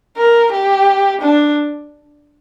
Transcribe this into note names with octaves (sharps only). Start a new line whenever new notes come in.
A#4
G4
D4